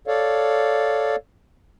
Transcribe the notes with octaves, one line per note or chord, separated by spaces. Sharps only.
A4 C#5 D5 F5